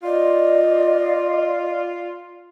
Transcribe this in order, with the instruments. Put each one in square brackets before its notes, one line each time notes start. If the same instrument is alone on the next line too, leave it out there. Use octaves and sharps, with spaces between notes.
[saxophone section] F4 [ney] D5 [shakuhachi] D#5